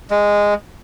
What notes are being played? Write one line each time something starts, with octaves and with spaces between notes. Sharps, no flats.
G#3